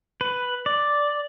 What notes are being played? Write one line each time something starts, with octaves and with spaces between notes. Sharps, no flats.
B4
D5